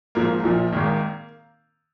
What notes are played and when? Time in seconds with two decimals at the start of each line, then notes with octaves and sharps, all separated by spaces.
0.15 G#1 G#2 F3 A#3
0.43 A#1 A#2 F3
0.73 G#1 G#2 D#3